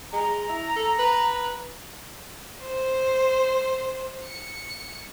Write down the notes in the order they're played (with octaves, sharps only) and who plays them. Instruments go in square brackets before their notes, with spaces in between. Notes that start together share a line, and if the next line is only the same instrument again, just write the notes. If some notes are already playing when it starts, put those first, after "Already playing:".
[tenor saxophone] G#3 [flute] A#5
[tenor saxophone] E4
A4
B4
[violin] C5
C#7